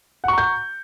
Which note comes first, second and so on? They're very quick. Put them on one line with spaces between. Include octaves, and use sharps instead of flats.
F#5 C#6 A#5 G6